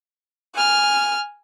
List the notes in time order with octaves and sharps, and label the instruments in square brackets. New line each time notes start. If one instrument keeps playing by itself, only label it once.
[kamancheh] G#5 F6